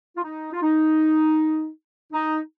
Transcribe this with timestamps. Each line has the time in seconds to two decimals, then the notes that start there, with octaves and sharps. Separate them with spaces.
0.15 F4
0.23 D#4
0.52 F4
0.62 D#4
2.12 D#4